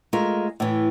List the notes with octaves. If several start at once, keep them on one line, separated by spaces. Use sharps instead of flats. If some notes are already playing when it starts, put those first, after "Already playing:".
G#3 A3 F4 A#4
A2 E3